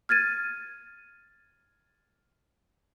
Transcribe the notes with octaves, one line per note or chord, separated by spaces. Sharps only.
F6 G#6 A6 D#7